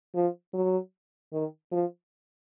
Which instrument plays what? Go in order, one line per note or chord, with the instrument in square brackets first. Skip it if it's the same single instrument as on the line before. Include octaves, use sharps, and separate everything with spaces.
[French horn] F3
F#3
D#3
F3